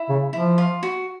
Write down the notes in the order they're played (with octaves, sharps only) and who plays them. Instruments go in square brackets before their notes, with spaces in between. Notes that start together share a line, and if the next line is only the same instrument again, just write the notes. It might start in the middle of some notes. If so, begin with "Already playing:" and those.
Already playing: [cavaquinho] E4
[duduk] C#3
[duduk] F3 [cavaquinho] E4
[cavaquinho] F4
F#4